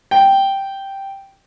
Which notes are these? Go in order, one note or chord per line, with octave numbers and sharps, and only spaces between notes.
G5